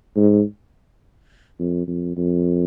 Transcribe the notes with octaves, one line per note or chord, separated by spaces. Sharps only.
G#2
F2
F2
F2